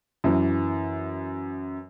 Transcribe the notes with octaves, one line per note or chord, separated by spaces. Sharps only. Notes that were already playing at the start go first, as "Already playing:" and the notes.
F#2 E3